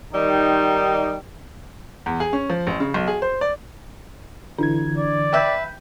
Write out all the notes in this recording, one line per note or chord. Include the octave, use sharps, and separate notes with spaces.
D#3 G3 D#4
E2
G#4
C#4
F3
A1
C#3
B1
G#4
C5
D5
D3 E3 D4 G#6
D5
B4 E5 G5 G6